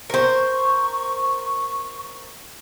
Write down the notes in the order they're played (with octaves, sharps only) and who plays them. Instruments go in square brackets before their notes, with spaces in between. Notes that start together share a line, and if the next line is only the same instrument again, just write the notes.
[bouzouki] A#4 C5 [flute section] C#6